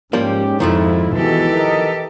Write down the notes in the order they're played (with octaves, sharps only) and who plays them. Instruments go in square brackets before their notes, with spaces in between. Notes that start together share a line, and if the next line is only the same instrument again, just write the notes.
[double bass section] G#2 [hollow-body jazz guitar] F3 G3 A#3 [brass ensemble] G#3 C#4 G4
[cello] F2 [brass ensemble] C3 E4 [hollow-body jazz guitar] D#3 F3 A3
[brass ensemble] B2 G#3 [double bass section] E3 [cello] G4 A4
[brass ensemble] A#4 D#5